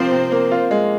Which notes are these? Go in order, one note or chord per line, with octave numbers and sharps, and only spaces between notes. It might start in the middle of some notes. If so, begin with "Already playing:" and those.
Already playing: C3 F3 A#3 C4 F4 C5
C3
A#3
F4
G#3